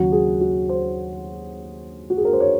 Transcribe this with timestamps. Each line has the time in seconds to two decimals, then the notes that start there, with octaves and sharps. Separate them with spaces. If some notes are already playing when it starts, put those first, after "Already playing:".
Already playing: D#2 C#3 F#3 F#4
0.12 G#4
0.41 F#4
0.69 C5
2.10 F#4
2.17 G#4
2.25 A#4
2.33 C5
2.40 C#5